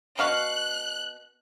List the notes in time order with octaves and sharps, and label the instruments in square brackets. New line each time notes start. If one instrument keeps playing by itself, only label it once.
[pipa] B2 F5 C#6 [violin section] F#6